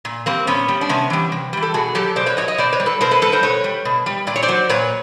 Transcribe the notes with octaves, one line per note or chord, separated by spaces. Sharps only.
A#2
G3 A#3 C4
A#2 B3 C#4
G3
D4
C3 B3 C#4
E3 G3
C3
E3 G3
A4
B2 F#4 G#4
F#3 G4 A4
B2 C5 D5
B4 C#5
F#3 C#5 D#5
C#5 D#5
B2 C5 D5
B4 C#5
G3
A4 B4
B2 A#4 C5
A4 B4
G3 A4 B4
A#4 C5
B2 B4 C#5
G3
B2
G3
A#2 D5
C#5
C5 D5
F#3
A#2 B4 C#5